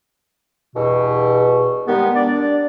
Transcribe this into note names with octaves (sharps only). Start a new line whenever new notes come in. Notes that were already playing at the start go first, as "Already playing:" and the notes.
E2 G2 B2
D#3 G3 G#3 B3
D4 D5